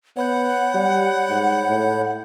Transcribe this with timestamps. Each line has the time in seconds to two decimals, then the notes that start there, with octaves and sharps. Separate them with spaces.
0.17 B3 C#5 F#5 B5 G6
0.74 G3
1.30 G#2
1.68 A2